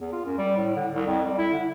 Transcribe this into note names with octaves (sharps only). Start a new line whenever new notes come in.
E2
F4
F#2
G3
A2
D3
C2
F2
G3
E4
D3